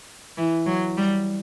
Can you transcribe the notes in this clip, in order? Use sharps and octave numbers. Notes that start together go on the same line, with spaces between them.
E3
F#3
G3